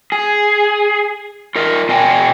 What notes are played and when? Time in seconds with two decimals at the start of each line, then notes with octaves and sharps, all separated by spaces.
0.12 G#4
1.56 F4 A#4 D#5
1.89 B2 D#5 G5 G#5